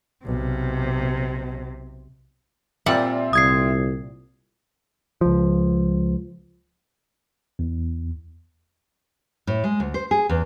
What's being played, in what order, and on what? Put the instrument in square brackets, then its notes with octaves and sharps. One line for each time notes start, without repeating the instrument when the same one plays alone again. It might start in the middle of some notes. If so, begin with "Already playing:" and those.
[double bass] B1 [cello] C3
[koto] A#2 G3 F#5 [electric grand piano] C4 F4 E5
[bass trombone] C2 [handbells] D#6 G#6 C7
[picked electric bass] C#2 F3
[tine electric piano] E2
[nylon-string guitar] A2
G#3
D2
C5
G#4
E2